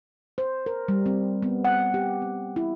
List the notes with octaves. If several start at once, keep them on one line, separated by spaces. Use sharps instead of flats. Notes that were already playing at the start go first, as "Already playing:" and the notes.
C5
A#4
G3
C4
B3
F#5
G4
C4
E4